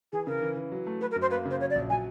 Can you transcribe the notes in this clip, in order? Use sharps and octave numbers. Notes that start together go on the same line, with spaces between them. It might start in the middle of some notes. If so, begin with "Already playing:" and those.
E3 G#4
C#3 A#4
E3
E3
F#3
A3
F#3 B4
A#4
F#2
C5
A#3 B4
C#3
C5
F#3 C#5
D5
A#1
F#3 G#5